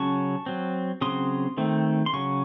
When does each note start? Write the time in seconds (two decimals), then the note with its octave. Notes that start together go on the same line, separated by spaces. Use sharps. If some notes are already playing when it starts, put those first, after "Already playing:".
Already playing: C#3 F#3 C#4 A5 C#6
0.46 F#3 C4
1.01 C#3 F#3 C4 C6 D#6
1.57 D#3 A3 C4
2.06 C6
2.13 C#3 F#3 C#6